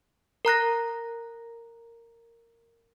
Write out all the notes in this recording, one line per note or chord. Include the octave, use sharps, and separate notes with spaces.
A#4 A#5 F#6 A#6